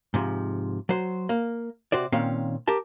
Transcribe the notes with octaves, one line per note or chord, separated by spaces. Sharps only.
G#2 C3 F3
F#3 C5
A#3
C3 F#4 C5 D5
A#2 D#3 C4 C#4 F5
G4 A#4 A5